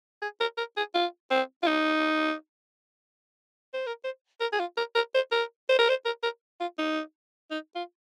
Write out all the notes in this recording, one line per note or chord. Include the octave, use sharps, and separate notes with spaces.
G#4
A#4
A#4
G#4
F4
C4
F4
D#4
C5
A#4
C5
A#4
G#4
F4
A#4
A#4
C5
A#4
C5
A#4
C5
A#4
A#4
F4
D#4
D#4
F4